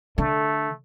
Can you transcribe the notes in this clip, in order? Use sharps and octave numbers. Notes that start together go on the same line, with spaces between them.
D3 A3